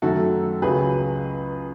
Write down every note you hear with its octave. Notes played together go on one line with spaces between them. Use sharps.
F#2 D#3 A3 F#4 A4
C#2 C#3 F#3 G#4 B4